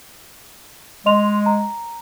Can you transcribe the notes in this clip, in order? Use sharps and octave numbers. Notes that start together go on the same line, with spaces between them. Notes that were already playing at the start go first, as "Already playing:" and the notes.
G#3 D#5 C6 F7
A#5